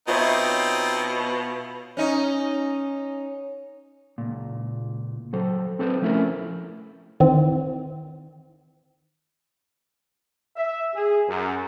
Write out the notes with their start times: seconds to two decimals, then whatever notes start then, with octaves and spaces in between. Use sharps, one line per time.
0.08 B2 C4 D#4 F4 C#5 E5
1.97 C#4 D#4
4.18 C#2 A#2
5.33 F#3 A4 C5
5.79 C4 A4 B4 C5
6.02 F3 A3 C#4 E4 A4 A#4
7.20 D#3 E3 C4
10.56 E5
10.94 G#4
11.29 F#2